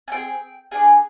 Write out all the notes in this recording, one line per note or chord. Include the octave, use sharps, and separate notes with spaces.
G#5
C4 F4 G5
G#4
D4 G#4 G#5